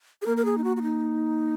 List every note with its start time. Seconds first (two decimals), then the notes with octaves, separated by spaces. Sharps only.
0.22 G#4
0.26 A#3 A#4
0.37 A#4
0.45 G#4
0.58 D#4
0.64 F#4
0.77 F#4
0.83 D#4